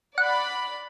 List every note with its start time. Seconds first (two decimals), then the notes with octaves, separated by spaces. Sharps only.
0.18 D5 F#5 B5